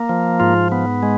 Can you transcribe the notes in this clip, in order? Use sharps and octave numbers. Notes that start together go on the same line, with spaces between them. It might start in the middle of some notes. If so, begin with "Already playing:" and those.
Already playing: A#3
F3
G#2 F4
B3
G#3